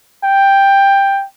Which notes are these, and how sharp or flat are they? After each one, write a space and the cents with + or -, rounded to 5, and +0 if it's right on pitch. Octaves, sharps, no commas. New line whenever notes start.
G5 +10